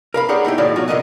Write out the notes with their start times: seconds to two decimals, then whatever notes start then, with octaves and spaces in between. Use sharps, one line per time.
0.14 A#4 F5 B5
0.29 D4 G4 G#4 A#4 C#5 F#5
0.45 A3 D#4 E4 G4
0.58 D#2 A2 G#3 F#4 D5 F5
0.76 B2 F#3 F4 F#4
0.88 F2 D3 A#4 D#5 F#5